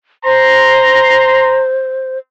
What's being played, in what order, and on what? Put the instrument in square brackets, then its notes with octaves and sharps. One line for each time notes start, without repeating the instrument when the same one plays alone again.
[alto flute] C5 [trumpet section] A#5 C6